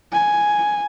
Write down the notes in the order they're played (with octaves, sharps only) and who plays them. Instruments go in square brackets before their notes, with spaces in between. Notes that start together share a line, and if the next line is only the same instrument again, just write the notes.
[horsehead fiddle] G#5